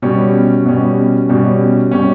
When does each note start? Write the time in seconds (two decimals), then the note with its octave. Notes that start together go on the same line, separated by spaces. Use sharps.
0.02 B2 G3 C#4
0.65 B2 G3 C#4
1.29 B2 G3 C#4
1.91 B2 G3 C#4